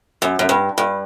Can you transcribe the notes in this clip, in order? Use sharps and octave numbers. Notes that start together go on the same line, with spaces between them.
F#2
F#2
G2
G2